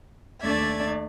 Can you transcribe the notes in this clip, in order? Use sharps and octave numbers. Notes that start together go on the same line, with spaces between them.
D#2 A3 D4 D5 E5 G#6